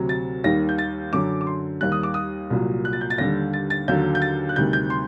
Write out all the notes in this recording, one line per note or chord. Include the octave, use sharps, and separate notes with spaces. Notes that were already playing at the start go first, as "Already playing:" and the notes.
Already playing: D2 C3 F#3
A6
D#2 D#3 G3 A#6
G6
A6
F#2 D3 F#3 D6
D6
C6
D#2 D#3 G3 F#6
D#6
D6
D#6
C2 A#2 F#3
F#6
A6
G6
A6
D#2 D3 G3 A#6
A6
A6
D#2 D3 F#3 G6
G6
A6
F#6
D2 C3 D#3 G3 G6
G6
C6